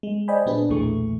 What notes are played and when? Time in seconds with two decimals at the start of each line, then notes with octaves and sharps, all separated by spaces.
0.03 G#3
0.28 C5 D5 D#5 G5 G#5 B5
0.46 A#2 B3 D4 G#4
0.69 B1 E2 A#2 E3 A3 C#6